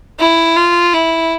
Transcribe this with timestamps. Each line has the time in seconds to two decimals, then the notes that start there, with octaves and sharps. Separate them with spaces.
0.19 E4
0.56 F4
0.94 E4